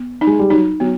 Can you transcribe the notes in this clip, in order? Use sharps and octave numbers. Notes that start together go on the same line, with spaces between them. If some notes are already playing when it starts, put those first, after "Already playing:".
Already playing: B3
D#4
G#3
G3
F#3 D#4
F#3 B3